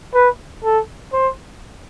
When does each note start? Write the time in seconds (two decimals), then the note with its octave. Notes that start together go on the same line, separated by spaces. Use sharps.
0.14 B4
0.64 A4
1.13 C5